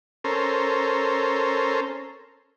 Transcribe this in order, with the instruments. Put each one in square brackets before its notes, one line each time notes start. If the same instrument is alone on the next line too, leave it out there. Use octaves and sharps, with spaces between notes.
[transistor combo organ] C#4 A4 A#4 C5